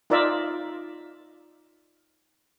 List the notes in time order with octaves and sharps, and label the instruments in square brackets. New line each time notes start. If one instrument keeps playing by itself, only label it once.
[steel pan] D#4 F4 A#4 D5 E5